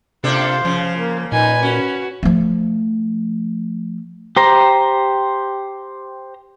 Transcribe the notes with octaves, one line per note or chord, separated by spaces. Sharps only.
C3 A#3 D4 F4 A4 C5
C#3 F3
A#3
A#2 D#4 B4 G#5
C#4 F#4
F3 A3
G4 C5 A#5